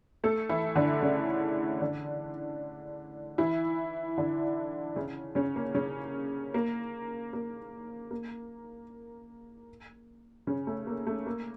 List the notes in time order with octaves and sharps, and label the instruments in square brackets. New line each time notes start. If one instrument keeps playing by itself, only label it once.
[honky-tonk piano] A3 A4
E3 E4
D3 D4
C#3 C#4
D3 D4
E3 E4
D3 D4
C#3 C#4
C#3 C#4
A#3
C#3 C#4
A#3
A#3
A#3
C#3 C#4
A3
A#3
A3
A#3